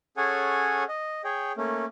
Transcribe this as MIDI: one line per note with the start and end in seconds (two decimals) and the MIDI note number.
0.17 0.84 61
0.17 0.84 68
0.17 0.84 69
0.17 0.84 73
0.17 0.84 78
0.17 0.84 80
0.89 1.22 75
1.24 1.52 68
1.24 1.52 73
1.24 1.52 79
1.57 1.85 57
1.57 1.85 58
1.57 1.85 61